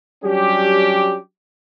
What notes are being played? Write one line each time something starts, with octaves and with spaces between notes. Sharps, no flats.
F#3 G3 C#4 D4 G4